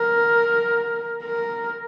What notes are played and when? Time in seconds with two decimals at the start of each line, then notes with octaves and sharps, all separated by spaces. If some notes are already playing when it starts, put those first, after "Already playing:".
Already playing: A#4
1.23 A#4